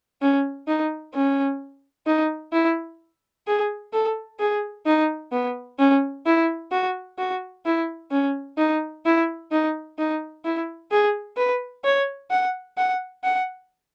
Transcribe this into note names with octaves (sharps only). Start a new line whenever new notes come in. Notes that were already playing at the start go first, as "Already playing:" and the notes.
C#4
D#4
C#4
D#4
E4
G#4
A4
G#4
D#4
B3
C#4
E4
F#4
F#4
E4
C#4
D#4
E4
D#4
D#4
E4
G#4
B4
C#5
F#5
F#5
F#5